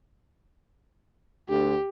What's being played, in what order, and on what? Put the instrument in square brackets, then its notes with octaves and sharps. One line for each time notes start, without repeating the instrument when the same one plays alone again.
[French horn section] D2 [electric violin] G4